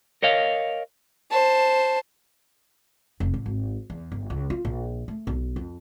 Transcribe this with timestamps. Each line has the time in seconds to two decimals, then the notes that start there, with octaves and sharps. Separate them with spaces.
0.23 A#4 C#5 D#5 F5
1.31 C5 A5
3.20 F1
3.34 A1
3.46 G#1
3.90 E2
4.12 G1
4.30 C#2
4.50 F4
4.65 A#1
5.08 A3
5.27 B1
5.56 F2